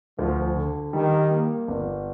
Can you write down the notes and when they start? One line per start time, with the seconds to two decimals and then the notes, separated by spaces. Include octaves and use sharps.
0.19 D2 F3
0.56 D3
0.93 D#3 G3
1.31 A#3
1.68 G1